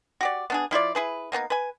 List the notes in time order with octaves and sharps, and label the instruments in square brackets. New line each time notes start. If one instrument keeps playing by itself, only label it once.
[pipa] F#4 G4 D5
B3 D4 G#4
F3 E4 F4 D5
E4 G#4 B4
A#3 B3 C#4 D#4
B4 G#5